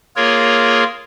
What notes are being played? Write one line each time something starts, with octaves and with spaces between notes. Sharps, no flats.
A#3 F4 G#4 A#4 C#5